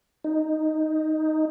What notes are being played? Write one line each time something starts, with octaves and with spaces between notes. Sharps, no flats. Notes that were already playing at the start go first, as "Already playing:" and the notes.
D#4